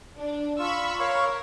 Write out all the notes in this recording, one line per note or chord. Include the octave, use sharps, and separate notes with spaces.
D4
F4 B5 C#6 E6
A#4 C#5 F5 C#6